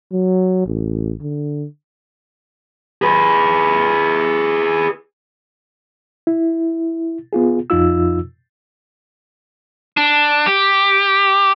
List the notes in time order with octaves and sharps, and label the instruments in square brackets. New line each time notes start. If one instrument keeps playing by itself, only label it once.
[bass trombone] F#3
A1
D3
[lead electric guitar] G#4 B4
[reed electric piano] E4
B3 F4 G#4
F2 F3 D#4 F4 E6
[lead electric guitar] D4
G4